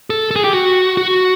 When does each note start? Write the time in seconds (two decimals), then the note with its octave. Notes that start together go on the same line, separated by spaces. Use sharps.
0.10 A4
0.31 A4
0.36 G#4
0.44 G4
0.53 F#4
0.97 F#4